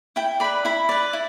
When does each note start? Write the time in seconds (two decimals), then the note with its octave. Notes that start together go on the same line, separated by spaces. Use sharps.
0.16 E4 G5
0.40 D5 B5
0.44 B4
0.65 E4 B5
0.89 B4 D5
1.13 E4